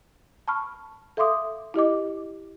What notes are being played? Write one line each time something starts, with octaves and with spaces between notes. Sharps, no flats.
A5 B5 C#6 F6
A4 E5 F5 C6 D6 D#6
E4 G4 D#5 D6